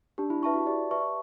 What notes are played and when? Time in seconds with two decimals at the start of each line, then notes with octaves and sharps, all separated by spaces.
0.18 D4 G4
0.30 E4
0.42 E4 B4 E5 A5 C#6
0.54 F#4
0.67 G4 D5
0.91 B4 E5 A5 C#6